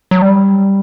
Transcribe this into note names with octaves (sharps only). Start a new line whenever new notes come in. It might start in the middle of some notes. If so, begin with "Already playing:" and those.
F#3
G3